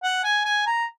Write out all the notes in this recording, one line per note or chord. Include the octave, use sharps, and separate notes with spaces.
F#5
G#5
G#5
A#5